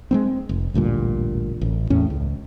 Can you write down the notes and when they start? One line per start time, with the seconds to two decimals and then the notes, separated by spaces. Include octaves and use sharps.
0.11 G#3 A#3 C4
0.49 F1
0.74 A1 D2 G2 A#2
1.61 A1
1.90 E2 A2 C#4
2.10 C#2